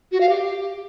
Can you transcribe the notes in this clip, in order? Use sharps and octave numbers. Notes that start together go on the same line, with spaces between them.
F#4
F5
G4